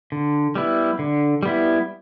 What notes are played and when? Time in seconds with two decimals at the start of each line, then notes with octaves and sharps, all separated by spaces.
0.12 D3
0.55 G3 B3 E4
0.99 D3
1.43 G3 B3 E4